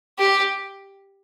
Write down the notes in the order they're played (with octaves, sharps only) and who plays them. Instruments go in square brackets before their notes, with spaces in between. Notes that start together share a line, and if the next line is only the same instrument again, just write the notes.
[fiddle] G4